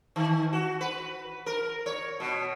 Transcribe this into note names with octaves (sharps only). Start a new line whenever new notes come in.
D#3
F#4
B4
A#4
C#5
B2